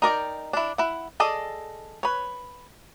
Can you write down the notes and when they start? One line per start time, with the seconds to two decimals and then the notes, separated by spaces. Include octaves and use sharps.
0.02 D#4 A#4 D5 G5
0.53 D4 E4
0.78 E4 F#5
1.20 G#4 A4 D5 D#5
2.03 B4 C#5